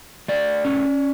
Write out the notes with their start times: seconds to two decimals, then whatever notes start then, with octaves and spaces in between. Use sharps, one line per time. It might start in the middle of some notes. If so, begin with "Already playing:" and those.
0.28 A3 D5
0.65 C#4